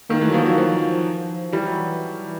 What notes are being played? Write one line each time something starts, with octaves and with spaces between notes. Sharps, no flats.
D#3 A#3
E3 A3
F#3
F3 A#3
F#3
F3
E3 G3
F#3